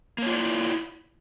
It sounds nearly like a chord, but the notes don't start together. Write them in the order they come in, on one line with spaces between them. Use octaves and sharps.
A#3 C#5 F4 D5 E4